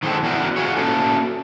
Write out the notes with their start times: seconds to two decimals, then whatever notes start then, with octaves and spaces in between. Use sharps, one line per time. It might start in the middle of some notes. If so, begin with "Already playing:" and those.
0.03 D#3 F#3 G#3 C4 G4 A4
0.23 E2 D3 F#4 A#4
0.56 F4 F#4 G#4 C#5
0.76 A3 A#3 C#4 F#4 A4